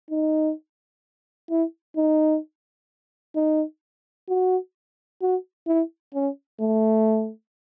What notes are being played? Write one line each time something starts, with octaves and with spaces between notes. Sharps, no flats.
D#4
E4
D#4
D#4
F#4
F#4
E4
C#4
A3